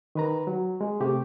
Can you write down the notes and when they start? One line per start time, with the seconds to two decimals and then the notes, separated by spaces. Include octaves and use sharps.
0.15 D#3 B4 A#5
0.47 F#3
0.81 G#3
1.01 C3 A3 G4